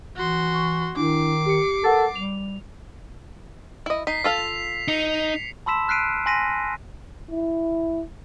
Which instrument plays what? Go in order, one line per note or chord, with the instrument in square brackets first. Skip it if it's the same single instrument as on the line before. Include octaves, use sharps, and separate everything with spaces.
[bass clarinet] E3 [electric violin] F#4 C6
[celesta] C#6
[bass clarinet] D#3 [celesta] D4 E4 [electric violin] D6 C7
[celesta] G4 C#7
[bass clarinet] A4 [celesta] A#4 F#5 A6
[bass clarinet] G3 [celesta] F7
[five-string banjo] E4 D#5
[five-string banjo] D#4 [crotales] B6 C7
[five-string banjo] F4 A4 F5 [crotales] B6 F7
[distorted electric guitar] D#4 [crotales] C#7
[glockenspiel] A5 B5 C6 E6 B6 E7
F6 F#6 B6 C7 D7 D#7
G#5 C6 A#6 B6 D#7
[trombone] E4